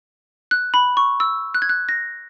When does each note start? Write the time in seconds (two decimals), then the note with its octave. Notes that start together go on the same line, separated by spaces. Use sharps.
0.51 F#6
0.74 B5
0.97 C#6
1.20 E6
1.55 F#6
1.62 G#6
1.69 F#6
1.89 A#6